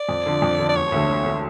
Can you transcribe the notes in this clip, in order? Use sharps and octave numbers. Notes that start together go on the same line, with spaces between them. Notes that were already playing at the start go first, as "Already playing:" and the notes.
Already playing: D5
F2
D3 F3
F2
D3 F3
D5
E1 C#5
D2 D3 A3
E1
D3 A3